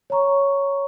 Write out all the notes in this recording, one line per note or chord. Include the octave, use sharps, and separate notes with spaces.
C#5 A#5 C#6